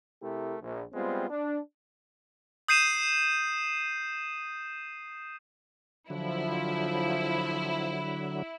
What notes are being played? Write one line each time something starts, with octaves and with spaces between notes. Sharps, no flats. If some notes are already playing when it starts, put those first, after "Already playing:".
C3 A3 E4 G4 A#4
A#1
G3 G#3 B3 C4 F4
D4
D#6 G6 C7 D#7 E7
D3 F3 F#3 E4